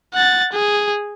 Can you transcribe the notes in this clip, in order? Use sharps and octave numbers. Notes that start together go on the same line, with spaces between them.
F#5 A6
G#4